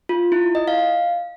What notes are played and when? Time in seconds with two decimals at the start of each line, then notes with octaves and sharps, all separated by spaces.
0.09 F4
0.32 E4
0.55 D#5
0.68 F5